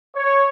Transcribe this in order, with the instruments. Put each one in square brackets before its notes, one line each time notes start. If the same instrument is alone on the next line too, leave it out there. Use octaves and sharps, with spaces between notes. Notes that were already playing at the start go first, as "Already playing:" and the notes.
[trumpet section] C#5